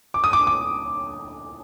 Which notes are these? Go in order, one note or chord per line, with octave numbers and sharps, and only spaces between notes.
D6
D#6
D6
D6